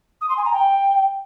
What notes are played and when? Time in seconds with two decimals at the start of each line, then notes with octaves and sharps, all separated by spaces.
0.21 D#6
0.29 C6
0.37 G#5
0.45 A#5
0.53 G5